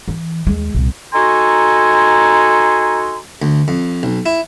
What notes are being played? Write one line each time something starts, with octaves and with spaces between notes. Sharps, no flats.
E3
D#2 G#3
C2 A#2
D#4 F#4 A4 G#5 A#5 C6
D2
F2
B1
E4